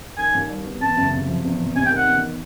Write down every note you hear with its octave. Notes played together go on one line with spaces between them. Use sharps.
D#3 G#5
D#2
G3
B3
E2 A5
F#1
C3
F3
E2
F1
C3 G#5
G5
D#3
F#5
E2